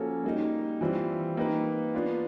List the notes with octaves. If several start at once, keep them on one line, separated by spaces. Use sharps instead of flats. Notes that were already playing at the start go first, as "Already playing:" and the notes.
Already playing: F3 A#3 C#4 F#4 A4
G3 A#3 D#4
E3 G3 C4 F4
A#3 D#4 G4 B4
B3 D4 F4